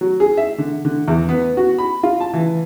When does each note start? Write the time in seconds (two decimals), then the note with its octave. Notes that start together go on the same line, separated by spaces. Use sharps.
0.01 F#3
0.20 G#4
0.37 E5
0.58 D3
0.85 D3
1.08 E2
1.29 B3
1.57 F#4
1.78 B5
2.03 F4
2.20 A5
2.34 E3